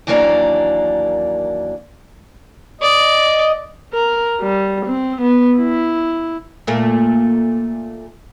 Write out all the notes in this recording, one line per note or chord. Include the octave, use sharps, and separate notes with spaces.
D#2 E3 F#3 A#3 D4 A#5
D5 D#5
A#4
G3
C4
B3
E4
A#2 A3 A#3